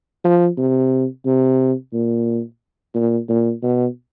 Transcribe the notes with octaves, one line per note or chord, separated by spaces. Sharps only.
F3
C3
C3
A#2
A#2
A#2
B2